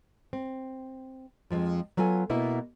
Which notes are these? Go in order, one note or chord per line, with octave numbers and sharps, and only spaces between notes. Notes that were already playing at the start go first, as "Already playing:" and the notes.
C4
F2 F3 G3 G#3 C4
F#3 B3 F4 A4 G#5
B2 A#3 B3 E4